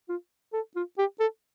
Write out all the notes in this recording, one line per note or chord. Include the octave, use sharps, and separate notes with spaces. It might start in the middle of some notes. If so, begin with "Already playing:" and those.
F4
A4
F4
G4
A4